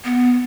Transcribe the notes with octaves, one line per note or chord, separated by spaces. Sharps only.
B3